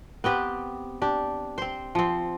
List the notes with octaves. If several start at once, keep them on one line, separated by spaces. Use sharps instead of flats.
B3 C4 G4 B4
D4 G4
C4 C5
F3 C4